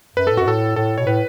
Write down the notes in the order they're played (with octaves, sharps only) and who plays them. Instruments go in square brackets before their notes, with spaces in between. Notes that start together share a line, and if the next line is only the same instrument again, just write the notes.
[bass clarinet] F#2 [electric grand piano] B4
[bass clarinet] A2 [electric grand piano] A4
[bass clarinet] F#2 [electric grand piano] F#4
[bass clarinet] A2 [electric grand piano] A4
[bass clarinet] A2 [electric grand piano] A4
[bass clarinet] B2 [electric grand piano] C#5
[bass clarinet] A2 [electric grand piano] B4